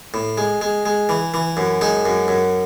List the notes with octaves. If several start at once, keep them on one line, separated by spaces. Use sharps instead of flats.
A2
G#3
G#3
G#3
E3
E3
F#2
G#3 D#4
F#2
F#2